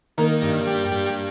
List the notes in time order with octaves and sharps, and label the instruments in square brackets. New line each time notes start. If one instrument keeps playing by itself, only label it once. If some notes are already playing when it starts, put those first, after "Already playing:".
[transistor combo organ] D#3 [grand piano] A#3 A#4
[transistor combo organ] G2
G3
G2